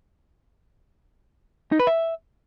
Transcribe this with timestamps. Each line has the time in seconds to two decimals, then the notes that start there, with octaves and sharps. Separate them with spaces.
1.72 D#4
1.79 B4
1.87 E5